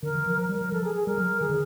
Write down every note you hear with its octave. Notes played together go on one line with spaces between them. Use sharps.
D3 A#4
E3
F3
F3
G3
A#4
F#3
F3 A4
G#4
G#4
G3 A#4
F#3
D#3 G#4
D3